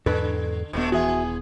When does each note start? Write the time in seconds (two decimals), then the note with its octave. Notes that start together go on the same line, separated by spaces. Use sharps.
0.06 E2 G#2 D3 A4 B4
0.73 D#1 B2 A3 B3 D4
0.92 E3 F#4 G#4 E5